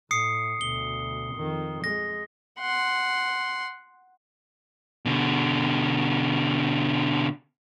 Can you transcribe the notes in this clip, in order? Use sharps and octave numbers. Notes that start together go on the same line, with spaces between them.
A2 D#6 C7 C#7
D2 B2 G7
F2 D#3
G#3 A#6
F#5 C6
B2 D3